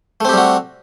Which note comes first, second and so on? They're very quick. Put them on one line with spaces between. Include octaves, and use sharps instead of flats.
A3 C4 G4 G3 F#4